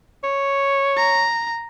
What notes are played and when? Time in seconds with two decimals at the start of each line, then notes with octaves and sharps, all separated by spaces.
0.24 C#5
0.97 A#5